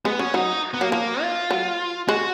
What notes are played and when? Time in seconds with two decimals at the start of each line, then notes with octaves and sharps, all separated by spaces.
0.05 G#3 B3
0.19 F#3 C#4
0.34 F#3 D#4
0.74 B3
0.81 F#3 A#3
0.92 F3 A#3
1.22 F4
1.51 F#3
2.08 G#3 F#4